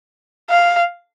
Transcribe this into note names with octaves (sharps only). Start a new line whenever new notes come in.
F5